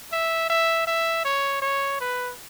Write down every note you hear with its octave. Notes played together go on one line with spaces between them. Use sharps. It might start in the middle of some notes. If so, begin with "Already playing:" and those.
E5
E5
E5
C#5
C#5
B4